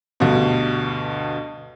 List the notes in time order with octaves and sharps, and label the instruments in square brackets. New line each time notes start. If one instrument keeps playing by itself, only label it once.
[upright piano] D2 G2 B2